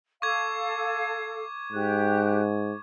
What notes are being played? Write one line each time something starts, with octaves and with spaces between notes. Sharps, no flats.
A4 F5 C#6 D6 G#6
G#2 G4 F#6